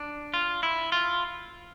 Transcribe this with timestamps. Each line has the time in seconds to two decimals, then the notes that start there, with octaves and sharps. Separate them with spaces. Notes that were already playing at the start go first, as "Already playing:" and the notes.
Already playing: D4
0.34 F4
0.63 E4
0.92 F4